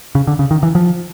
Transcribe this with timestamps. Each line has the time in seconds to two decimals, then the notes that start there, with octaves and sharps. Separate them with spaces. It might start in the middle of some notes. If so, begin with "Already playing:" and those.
0.15 C#3
0.27 D3
0.39 C#3
0.51 D#3
0.63 E3
0.75 F3